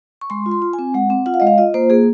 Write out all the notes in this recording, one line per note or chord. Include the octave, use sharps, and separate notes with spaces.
C#6
G#3 C6
F4
C6
F4
G#5
C4
G#3 F#5
C4
F4 F#5
F5
G#3 D#5
F5
F4 D#5
A#3 C5
A#3 G#4